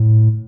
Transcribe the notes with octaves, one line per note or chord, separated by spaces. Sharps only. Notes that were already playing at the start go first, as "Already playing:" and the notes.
Already playing: A2